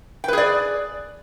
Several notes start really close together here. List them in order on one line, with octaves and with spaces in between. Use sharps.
G5 B4 G#4 D5